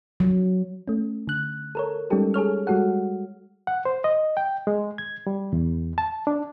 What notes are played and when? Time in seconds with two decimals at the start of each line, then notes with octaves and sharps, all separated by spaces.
0.20 F#3
0.88 A3 C#4
1.27 D3 F#6
1.75 A4 A#4 C#5
2.10 G3 G#3 C#4 D#4 G4 A4
2.34 G#4 A4 C#5 F6
2.67 G3 G#3 F#4 A4 F#5
3.67 F#5
3.85 C5
4.04 D#5
4.37 G5
4.67 G#3
4.98 G#6
5.27 G3
5.53 E2
5.98 A5
6.27 D4